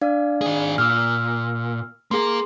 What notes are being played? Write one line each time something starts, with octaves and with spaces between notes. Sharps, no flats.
D4 D5 F5
D#3 G#4
A#2 E6 F6
A#3 G#4 A#4 C6